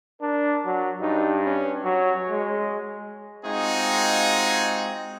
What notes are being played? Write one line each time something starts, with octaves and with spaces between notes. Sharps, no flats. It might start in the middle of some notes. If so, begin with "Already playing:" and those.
D4 A#4
F#3
G2 D#4
C#4
F#3 C#5
G#3
G#3 C4 D#4 F4 F#4 G#4